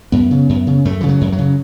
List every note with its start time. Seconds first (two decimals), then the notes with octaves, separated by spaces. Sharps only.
0.12 F#2 B3
0.31 C#3
0.49 F#2
0.67 C#3
0.85 F#2 A3
1.01 C#3 E3
1.09 F#3
1.21 F#2
1.32 F#3
1.38 C#3